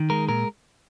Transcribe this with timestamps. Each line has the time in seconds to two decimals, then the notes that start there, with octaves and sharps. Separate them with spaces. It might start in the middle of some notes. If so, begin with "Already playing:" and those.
Already playing: D#3
0.10 G#3 A#4
0.28 A#2 A#4